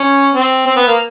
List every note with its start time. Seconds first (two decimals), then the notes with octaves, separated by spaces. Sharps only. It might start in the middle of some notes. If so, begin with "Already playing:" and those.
Already playing: C#4
0.34 C4
0.66 C4
0.76 B3
0.87 A#3